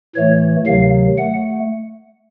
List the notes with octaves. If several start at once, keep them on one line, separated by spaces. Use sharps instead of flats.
A2 E3 A3 C#5
D2 C3 D#3 F#3 F5
A3 F#5